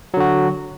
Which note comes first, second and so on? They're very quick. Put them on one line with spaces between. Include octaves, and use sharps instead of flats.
F#3 D3 F#4